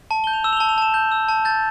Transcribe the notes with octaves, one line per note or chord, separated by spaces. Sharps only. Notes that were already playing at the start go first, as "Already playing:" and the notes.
A5
G6 G7
F7
E6 E7
F7
G7
A5
F7
A5 E7
G6
E6
A5
G6 A6